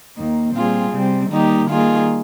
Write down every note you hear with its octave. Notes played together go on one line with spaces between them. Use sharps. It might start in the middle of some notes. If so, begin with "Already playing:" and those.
D#2 D#3 A#3
A#2 G3 C4 F4 G#4
C3 G3 C4
D#3 G3 A#3 D#4 G4
D#3 G3 A#3 F4 G#4